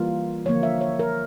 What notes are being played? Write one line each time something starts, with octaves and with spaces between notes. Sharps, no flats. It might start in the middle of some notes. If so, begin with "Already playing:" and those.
Already playing: E3 G3 A#3 F4
D3 F3 A#3 C#5
E5
C#5
A#4